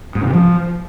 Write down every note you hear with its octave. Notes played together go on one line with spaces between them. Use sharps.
G#2
C#3
C3
F3